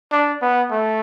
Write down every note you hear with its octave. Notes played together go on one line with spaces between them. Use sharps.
D4
B3
A3